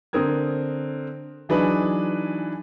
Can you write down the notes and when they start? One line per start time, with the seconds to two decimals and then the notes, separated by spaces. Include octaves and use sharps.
0.13 D3 C4 A#4 D#6 G#6
1.49 E3 F#3 D4 D#4 G#4 B4